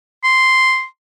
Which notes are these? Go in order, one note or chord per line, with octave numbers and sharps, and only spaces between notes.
C6